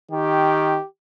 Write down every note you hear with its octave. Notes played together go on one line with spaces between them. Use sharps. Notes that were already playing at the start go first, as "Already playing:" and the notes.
D#3 G4